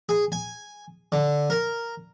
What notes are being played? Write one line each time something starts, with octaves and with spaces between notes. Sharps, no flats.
G#4
G#5
D3
A#4